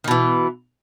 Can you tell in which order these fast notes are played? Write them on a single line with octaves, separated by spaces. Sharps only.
D#3 B2 E3